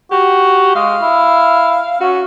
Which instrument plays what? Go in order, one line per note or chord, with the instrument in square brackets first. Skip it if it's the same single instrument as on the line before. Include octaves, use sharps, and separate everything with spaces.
[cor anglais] F#4 [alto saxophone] G4
[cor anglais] G#3 [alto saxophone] F5
[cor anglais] E4
[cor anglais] C#4 [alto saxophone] F#4